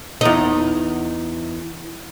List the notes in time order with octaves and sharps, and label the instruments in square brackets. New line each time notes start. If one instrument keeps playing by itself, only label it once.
[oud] E2 D#4